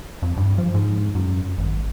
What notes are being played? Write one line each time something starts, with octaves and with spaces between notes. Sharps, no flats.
F2
G2
F3
G#2
F#2
G#1